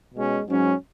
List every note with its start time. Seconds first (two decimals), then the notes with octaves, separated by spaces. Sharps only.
0.15 B2 G#3 C#4
0.47 G#2 F#3 C#4